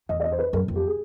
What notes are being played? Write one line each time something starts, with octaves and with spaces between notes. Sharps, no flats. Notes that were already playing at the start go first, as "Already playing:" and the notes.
E2 D#5
D5
D#5
C5
B4
F#2 A#4
F2
G4
G#4